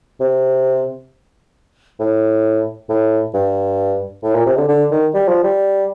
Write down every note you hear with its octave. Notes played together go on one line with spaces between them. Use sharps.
C3
A2
A2
G2
A2
A#2
C3
D3
D3
D#3
G3
F3
G3